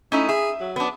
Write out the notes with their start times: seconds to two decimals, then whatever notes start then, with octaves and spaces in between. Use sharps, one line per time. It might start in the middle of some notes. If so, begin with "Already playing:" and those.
0.12 A3 C#4 D#4 E4
0.29 G#4 E5
0.60 F#3
0.76 B3 D4